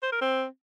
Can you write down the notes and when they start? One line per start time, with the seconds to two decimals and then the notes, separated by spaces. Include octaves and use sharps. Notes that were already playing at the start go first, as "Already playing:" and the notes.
0.03 C5
0.12 A#4
0.21 C4